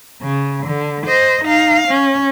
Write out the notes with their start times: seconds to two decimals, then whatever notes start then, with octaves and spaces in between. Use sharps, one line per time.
0.22 C#3
0.67 D3
1.07 C5 D#5
1.45 D#4 F5
1.88 C#4